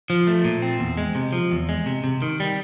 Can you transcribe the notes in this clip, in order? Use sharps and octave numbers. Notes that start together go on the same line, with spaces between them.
F3
A3
A#2
C4
E2
G#3
C3
F3
E2
G#3
C3
C3
D#3
G3